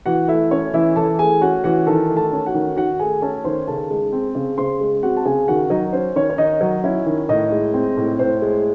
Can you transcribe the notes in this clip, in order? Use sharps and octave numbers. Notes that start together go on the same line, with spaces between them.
E3 F#4 F#5
A3 E4 E5
C#4 C#5
E3 E4 E5
E3 A4 A5
A3 G#4 G#5
C#4 F#4 F#5
E3 F#4 F#5
D#3 A4 A5
A3
A4 A5
C#4
F#4 F#5
D#3
D#3 F#4 F#5
A3 G#4 G#5
C#4 A4 A5
D#3 C5 C6
C#3 A4 A5
G#3
C4
C#3
C#3 C5 C6
G#3
C4 F#4 F#5
A5
C#3 G#4 G#5
D#3 F#4 F#5
F#3 D#4 D#5
C#4 C5
D#3 C#4 C#5
C#5
D#3 D#4 D#5
F#3
C#4 E4 E5
D#3
A2 D#4 D#5
G#3
C4
A2
A2 C5
G#3